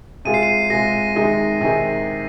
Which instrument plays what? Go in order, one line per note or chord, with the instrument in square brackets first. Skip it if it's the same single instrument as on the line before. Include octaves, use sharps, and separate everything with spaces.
[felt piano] C3 G#3 F4 G#4 [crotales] D#7
[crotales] C7
D#7
[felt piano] C3 G#3 F4 G#4 [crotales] A#6
[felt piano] C3 D#3 G#3 D#4 G#4
C3 D#3 G#3 D#4 G#4